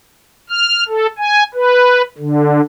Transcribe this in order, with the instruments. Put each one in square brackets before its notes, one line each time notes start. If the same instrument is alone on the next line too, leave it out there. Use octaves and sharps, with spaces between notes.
[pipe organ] F6
A4
G#5
B4
D3